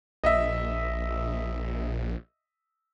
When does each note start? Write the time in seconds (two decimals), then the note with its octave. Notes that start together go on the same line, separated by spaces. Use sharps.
0.24 A#1 D#5 E5